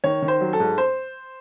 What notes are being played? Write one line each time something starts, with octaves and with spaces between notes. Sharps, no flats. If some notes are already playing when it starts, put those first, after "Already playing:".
D#3 C#5
D#3
C5
F#3
A4
G#2
C5